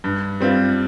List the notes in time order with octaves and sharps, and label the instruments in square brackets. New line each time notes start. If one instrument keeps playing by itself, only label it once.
[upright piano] G2
G3 C4 F4